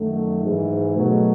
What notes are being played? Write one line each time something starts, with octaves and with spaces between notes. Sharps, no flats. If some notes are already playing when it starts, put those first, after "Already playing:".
Already playing: F#2 D#3 F#3 A3
G#2 E3 G#3
B2 F#3 A3